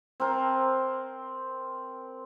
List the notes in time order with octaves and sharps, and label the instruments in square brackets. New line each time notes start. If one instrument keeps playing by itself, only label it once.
[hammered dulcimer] C4 A#4 G#5 A5